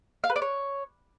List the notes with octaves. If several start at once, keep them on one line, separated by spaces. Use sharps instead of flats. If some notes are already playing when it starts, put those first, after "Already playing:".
F5
B4
D5
C#5